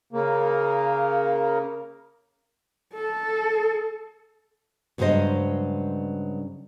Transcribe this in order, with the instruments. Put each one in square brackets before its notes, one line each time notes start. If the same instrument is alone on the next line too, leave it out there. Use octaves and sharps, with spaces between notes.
[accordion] C#3 A#3
[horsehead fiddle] A4
[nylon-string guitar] G2 C#3 F#3 G#3 C5 D#5